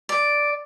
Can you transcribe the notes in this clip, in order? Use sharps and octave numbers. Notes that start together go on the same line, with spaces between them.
D5